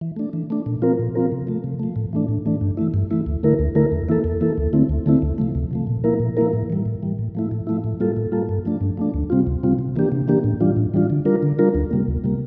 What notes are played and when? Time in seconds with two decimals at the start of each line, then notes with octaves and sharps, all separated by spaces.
0.01 E3
0.16 A3 D4
0.33 E3
0.50 A3 D4
0.66 A#2
0.82 F3 C4 F4 A#4
0.99 A#2
1.15 F3 C4 F4 A#4
1.32 C3
1.47 F3 A3
1.64 C3
1.80 F3 A3
1.96 A2
2.13 E3 A3 D4
2.28 A2
2.46 E3 A3 D4
2.61 G2
2.77 E3 A3 E4
2.94 G2
3.11 E3 A3 E4
3.26 D2
3.43 D3 A3 E4 A#4
3.59 D2
3.75 D3 A3 E4 A#4
3.92 E2
4.09 E3 A#3 E4 A4
4.24 E2
4.41 E3 A#3 E4 A4
4.58 D2
4.73 D3 A3 C4 E4
4.89 D2
5.06 D3 A3 C4 E4
5.22 D2
5.38 C3 F3 A3
5.55 D2
5.71 C3 F3 A3
5.87 A#2
6.04 F3 A#3 E4 A#4
6.20 A#2
6.37 F3 A#3 E4 A#4
6.53 A2
6.70 E3 G3
6.86 A2
7.02 E3 G3
7.19 A2
7.35 F3 A3 E4
7.51 A2
7.67 F3 A3 E4
7.84 A2
8.00 G3 A#3 F4 A4
8.17 A2
8.32 G3 A#3 F4 A4
8.49 G2
8.65 F3 A3 D4
8.81 G2
8.97 F3 A3 D4
9.14 D2
9.30 C3 G3 C4 F4
9.47 D2
9.63 C3 G3 C4 F4
9.79 C3
9.96 E3 A#3 D4 G4
10.12 C3
10.28 E3 A#3 D4 G4
10.44 A2
10.60 E3 G3 D4 F4
10.76 A2
10.94 E3 G3 D4 F4
11.10 D3
11.25 G3 D4 F4 A#4
11.43 D3
11.59 G3 D4 F4 A#4
11.75 D2
11.91 C3 G3 A#3
12.08 D2
12.24 C3 G3 A#3